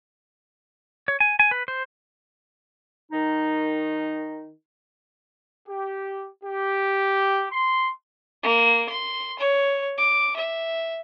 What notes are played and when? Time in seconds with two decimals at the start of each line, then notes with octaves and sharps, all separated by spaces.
1.08 C#5
1.20 G#5
1.39 G#5
1.51 B4
1.68 C5
3.11 D#3 D#4
5.69 G4
6.44 G4
7.52 C6
8.43 A#3
8.89 C6
9.39 C#5
9.98 D6
10.36 E5